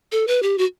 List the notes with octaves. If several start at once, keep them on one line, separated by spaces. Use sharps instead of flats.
A4
B4
G4
F#4